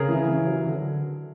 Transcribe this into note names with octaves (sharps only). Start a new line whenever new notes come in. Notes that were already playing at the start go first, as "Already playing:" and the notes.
Already playing: C#3 G#4 A#4
E3
E3
F#3
D3